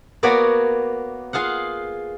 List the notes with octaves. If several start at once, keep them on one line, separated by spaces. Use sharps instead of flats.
A#3 B3 F#4 B4 C#5 D5
F4 G#4 F5 F#5